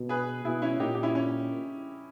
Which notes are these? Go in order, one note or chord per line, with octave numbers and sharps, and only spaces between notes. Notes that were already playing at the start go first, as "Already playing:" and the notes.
Already playing: B2
G#4 B4
B2 E4 G#4
C#4 E4
A#2 D#4 G4
G4
C#4 E4
C#4